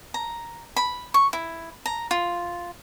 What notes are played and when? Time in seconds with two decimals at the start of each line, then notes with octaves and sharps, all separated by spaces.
0.14 A#5
0.76 B5
1.14 C#6
1.33 E4
1.86 A#5
2.11 F4